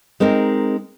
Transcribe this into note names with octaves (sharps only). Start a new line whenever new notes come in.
G#3 C4 D#4 A#4